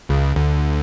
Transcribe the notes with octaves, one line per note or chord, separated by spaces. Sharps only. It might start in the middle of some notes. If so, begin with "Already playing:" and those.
C#2 C#3
D2 D3